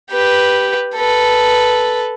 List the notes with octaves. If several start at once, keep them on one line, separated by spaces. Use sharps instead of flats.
G4 B4
A4 B4